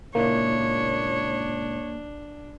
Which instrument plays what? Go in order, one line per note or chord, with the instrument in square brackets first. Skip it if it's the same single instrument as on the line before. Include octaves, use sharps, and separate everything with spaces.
[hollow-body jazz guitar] C#2 A#2 E4 [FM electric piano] A#3 [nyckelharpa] D4 [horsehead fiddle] C#5